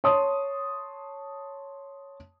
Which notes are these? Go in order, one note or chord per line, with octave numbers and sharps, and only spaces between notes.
C#5 A5 C6 D#6